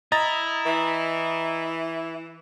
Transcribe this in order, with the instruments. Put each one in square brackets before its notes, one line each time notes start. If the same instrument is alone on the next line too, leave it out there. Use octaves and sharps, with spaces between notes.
[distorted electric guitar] E4 [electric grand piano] D#5 A#5 A6
[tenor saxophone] E3